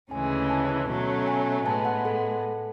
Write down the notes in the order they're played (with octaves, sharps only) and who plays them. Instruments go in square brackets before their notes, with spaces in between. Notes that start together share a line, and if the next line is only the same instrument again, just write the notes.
[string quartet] D2 C#3 E3 G#3 C#4 [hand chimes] G#5
[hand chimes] A5
[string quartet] B2 F#3 A3 C#4
[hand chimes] G#5
[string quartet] A2 G#3 B3 [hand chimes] A5
[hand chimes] F#5
A4